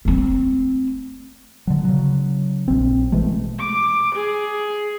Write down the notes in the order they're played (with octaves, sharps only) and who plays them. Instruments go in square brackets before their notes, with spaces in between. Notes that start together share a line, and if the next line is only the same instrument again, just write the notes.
[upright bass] A3 C4
[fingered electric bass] D3 F#3
C#3 F#3
A#1 C4
B2 E3 G#3 A3
[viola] D6
G#4